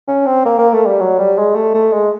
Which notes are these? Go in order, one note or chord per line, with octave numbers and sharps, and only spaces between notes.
C#4
C4
A#3
A#3
A3
G3
F#3
G3
G#3
A3
A3
G#3